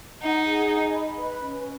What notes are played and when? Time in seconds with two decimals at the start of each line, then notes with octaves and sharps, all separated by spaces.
0.22 D#4 F#5
0.46 G#4
0.70 D#5
0.94 B5
1.17 B4
1.40 C#4